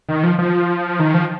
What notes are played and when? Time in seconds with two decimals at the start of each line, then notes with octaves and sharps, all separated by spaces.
0.09 D#3
0.23 F3
0.39 F3
0.99 D#3
1.14 F3